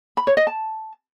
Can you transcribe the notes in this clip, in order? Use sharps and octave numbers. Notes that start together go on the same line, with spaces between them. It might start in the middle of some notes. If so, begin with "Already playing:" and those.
B5
C#5
D#5
A5